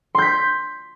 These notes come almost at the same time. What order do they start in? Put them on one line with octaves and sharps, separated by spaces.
C6 G6 B6